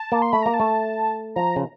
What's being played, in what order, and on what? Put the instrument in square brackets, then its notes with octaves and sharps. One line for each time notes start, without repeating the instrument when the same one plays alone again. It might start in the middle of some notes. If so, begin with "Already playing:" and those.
Already playing: [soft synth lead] A5
[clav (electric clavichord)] A#3
[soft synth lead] C6
[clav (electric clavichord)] A3 [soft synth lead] B5
[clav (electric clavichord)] A#3 [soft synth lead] A#5
[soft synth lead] A5
[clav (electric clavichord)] A3
[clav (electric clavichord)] F3 [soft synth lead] A#5
[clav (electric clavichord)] C#3